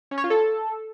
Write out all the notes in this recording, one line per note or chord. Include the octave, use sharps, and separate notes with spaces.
C#4
C#5
F4
A4